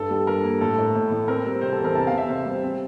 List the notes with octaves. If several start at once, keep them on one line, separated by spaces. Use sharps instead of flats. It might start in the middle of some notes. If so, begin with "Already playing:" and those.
Already playing: G2 A4
G3
G3 A#4
A#3
A2 A4
A2
A2
A2
C4 A#4
G3
C3 C5
A4
E2
A#4
C3 A5
F5
C3
E5
C3 C5
G3
C4